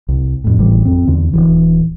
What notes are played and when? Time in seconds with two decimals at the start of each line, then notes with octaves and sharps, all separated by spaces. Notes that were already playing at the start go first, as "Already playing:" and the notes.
0.09 C2
0.44 F2 A2
0.58 G#1 A2 E3 G3
0.85 F2 C4
1.07 E2 D3
1.33 D#1 C#2 E3